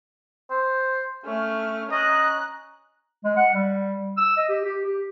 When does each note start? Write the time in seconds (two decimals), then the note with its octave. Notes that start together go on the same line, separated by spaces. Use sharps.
0.50 C5
1.25 A3 C#4 F6
1.92 C#4 D#5 A#5 F#6
3.24 G#3
3.36 F#5
3.54 G3
4.17 E6
4.37 D#5
4.49 G4
4.64 G4
4.85 G4